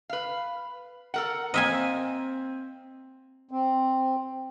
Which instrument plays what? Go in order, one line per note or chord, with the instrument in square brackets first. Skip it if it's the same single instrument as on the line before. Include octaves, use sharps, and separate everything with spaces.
[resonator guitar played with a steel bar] B4 F5
A4 A#4 F#5
[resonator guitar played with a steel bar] A#3 [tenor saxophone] C4 [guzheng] D#5 E5 G#5
[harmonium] C4